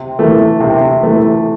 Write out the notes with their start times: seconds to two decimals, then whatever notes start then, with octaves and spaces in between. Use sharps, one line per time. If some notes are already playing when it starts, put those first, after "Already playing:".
Already playing: C3
0.19 E3 A3
0.60 C3
1.03 E3 A3